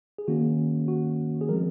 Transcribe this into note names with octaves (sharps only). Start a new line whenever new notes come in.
G#4
D#3 A#3 C#4 F#4
F#4
G#4
F3 G#3 C4 A#4